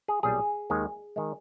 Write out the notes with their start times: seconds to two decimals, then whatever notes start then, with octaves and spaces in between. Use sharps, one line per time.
0.08 G#4
0.23 B1 A#2 G3 G#4
0.70 D#2 D#3 G#3
1.16 D#3 G#3